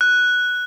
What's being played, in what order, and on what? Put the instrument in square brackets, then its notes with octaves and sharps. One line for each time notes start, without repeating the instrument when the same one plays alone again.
[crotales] F#6